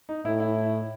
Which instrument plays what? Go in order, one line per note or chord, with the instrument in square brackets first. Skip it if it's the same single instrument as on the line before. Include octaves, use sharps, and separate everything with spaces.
[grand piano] D#4
[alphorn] A2 [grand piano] E4
[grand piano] E4